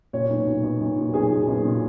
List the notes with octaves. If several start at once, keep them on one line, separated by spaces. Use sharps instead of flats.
A#2 C#5
B1
B1
B1
B1
A#2
B1 G#4
A#2
B1
A#2